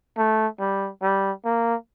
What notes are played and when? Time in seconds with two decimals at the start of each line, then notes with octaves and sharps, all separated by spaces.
0.17 A3
0.60 G3
1.02 G3
1.45 A#3